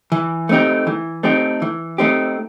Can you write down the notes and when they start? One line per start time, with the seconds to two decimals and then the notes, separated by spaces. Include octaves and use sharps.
0.12 E3
0.49 A3 C4 D#4 G4
0.87 E3
1.23 A3 C4 D#4 G4
1.62 E3
1.98 A3 C4 D#4 G4